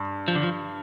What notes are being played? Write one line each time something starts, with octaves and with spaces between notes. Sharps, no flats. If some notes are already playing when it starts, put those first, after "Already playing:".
Already playing: G2
F3
D3
F3